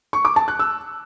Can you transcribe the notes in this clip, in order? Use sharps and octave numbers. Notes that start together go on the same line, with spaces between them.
C#6
D6
A5
F#6
E6